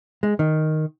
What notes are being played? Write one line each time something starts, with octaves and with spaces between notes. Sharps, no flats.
G#3
D#3